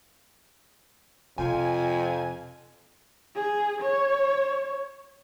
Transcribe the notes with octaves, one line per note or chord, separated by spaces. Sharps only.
F2 C3 F3 G#5
G#4
C#5